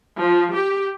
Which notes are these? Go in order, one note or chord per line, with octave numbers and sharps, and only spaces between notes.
F3
G4